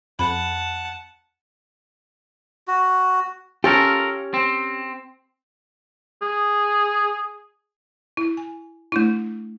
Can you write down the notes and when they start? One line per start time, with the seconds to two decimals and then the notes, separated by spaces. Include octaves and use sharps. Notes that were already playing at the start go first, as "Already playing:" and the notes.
0.19 F2 F#5 A5 B5
2.68 F#4
3.64 C#4 F4 G4 A4 A#4
4.34 C4
6.22 G#4
8.17 E4
8.37 G#5
8.92 A3 D4 E4